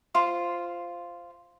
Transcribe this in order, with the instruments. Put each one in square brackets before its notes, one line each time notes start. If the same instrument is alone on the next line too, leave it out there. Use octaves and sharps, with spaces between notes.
[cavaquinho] F4 C5 C6